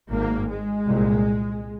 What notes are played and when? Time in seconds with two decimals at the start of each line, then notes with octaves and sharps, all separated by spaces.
0.10 G#1 G#2 A#3
0.49 G#3
0.85 C2 A#2